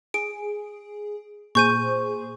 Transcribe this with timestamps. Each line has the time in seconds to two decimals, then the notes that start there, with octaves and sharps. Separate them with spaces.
0.14 G#4 D7
1.55 A#2 G#4 C5 C#6 G6 D#7